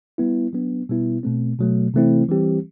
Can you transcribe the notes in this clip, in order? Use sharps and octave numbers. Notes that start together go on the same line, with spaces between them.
G3 B3 E4
F#3 B3 D4
B2 G3 B3 E4
B2 A3 C4
B2 F#3 A3
C3 E3 A3 C4 E4
E3 G3 C4 G4